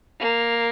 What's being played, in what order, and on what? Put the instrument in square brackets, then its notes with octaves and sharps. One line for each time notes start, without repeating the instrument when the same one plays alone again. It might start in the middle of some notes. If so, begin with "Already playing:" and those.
[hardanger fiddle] A#3